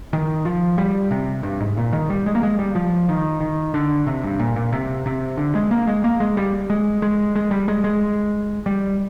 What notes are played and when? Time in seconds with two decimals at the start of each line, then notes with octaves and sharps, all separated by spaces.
0.13 D#3
0.45 F3
0.78 G3
1.11 C3
1.43 G2
1.60 G#2
1.77 A#2
1.93 D#3
2.10 G3
2.26 G#3
2.35 A#3
2.43 G#3
2.59 G3
2.75 F3
3.09 D#3
3.41 D#3
3.74 D3
4.07 C3
4.24 G2
4.39 A#2
4.56 A#2
4.72 C3
5.06 C3
5.37 D3
5.55 G#3
5.71 A#3
5.87 G#3
6.04 A#3
6.20 G#3
6.37 G3
6.70 G#3
7.02 G#3
7.36 G#3
7.51 G3
7.68 G#3
7.84 G#3
8.66 G3